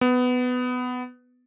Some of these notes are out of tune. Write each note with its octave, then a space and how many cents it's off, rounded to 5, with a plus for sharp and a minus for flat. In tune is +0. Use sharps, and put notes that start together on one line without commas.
B3 +15